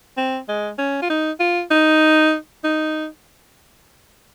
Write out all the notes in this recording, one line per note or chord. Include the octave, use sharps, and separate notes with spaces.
C4
G#3
C#4
F4
D#4
F4
D#4
D#4